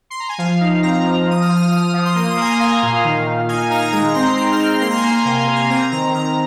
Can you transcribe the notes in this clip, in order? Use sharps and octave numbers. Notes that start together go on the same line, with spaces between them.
C6
A#5
G#5
F3 F5
D#4
C4 A#5
F3
F3 D#6
F6
F3
D#6
F3 D#6
F3
C6
A#3 D#6
C6
A#3 G#5
A#5
A#3 F5
A#2
D#3
D#3
D#4 G#5
G#5
D#4 A#5
G#5
G#3 A#5
C4 C6
C4 C6
F6
C4
F6
A#3 C6
A#5
G#5
A#3 A#5
G#5
C3 F5
F5
A#3
G#5
C4 A#5
D#3 A#5
D#3 A#5